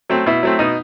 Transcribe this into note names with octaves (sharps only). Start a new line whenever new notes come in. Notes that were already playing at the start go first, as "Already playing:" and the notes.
F#3 A3 C4
B2 E4
F#3 A3 C4
B2 D#4